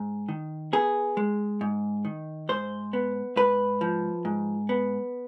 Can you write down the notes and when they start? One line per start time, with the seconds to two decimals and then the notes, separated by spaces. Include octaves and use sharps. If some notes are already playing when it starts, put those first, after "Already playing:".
Already playing: G#2
0.29 D#3
0.73 B3 G#4
1.17 G#3
1.61 G#2
2.05 D#3
2.49 G#2 C5
2.93 B3
3.36 G#2 B4
3.81 F3
4.25 G#2
4.69 B3